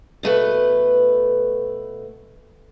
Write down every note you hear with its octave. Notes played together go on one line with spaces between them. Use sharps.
B2 A3 B4